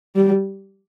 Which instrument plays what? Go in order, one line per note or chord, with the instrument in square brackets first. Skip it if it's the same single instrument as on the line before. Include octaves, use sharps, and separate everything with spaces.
[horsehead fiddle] G3